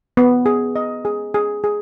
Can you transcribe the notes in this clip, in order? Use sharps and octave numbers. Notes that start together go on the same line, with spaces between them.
B3
G#4
D#5
G#4
G#4
G#4